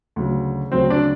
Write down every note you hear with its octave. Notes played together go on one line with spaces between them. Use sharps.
D2 C#3 F#3
D2 C#3 F#3 C4 C5
D4 D5